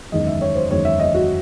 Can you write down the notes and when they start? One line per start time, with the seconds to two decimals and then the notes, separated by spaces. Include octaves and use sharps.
0.12 F#1 E2 D#3 G#3 D#5
0.27 E5
0.41 C#5
0.55 C5
0.70 F#1 E2 D#3 G#3 C#5
0.85 E5
1.00 D#5
1.14 F#4